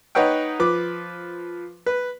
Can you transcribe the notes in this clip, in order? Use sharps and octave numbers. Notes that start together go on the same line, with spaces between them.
D#4 B4 C#5 F#5 G5
F3 B4 D6
B4